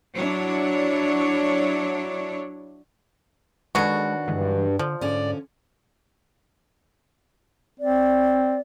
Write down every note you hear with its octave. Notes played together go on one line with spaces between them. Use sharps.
F#3 D4 E4 C#5
B2 D#3 F#3 G#3 D4 F#4 A4
G2 D3 E3 G#3
D3 F3
G#2 D3 C#4 D5
C4 D5